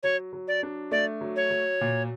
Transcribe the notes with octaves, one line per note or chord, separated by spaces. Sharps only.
F#3 C#5
F#3
D5
D4
A3 D5
F#3
C#5
F#3
A#2